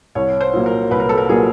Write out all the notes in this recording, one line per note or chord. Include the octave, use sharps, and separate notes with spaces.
C2 C#5
C5
A#2 F#3 A#3
A#4
C2 B4
A#4
A4
A#4
A#2 F#3 A#3 G#4